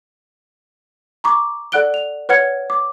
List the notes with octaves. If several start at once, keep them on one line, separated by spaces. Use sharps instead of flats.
A#5 C#6 D6
A4 D5 F#5 F#6 D7 G7
F7
B4 C#5 F#5 F6 G#6 C#7
D6